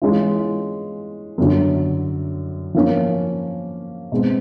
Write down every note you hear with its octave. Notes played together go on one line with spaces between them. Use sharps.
E3 G#3 C#4 F4
F#2 D3 F#3
F3 A#3 C#4
B2 G#3 C4